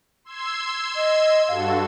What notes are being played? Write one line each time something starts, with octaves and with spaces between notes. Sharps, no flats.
C6 E6 G#6
D#5
G2 F#4 A4 F5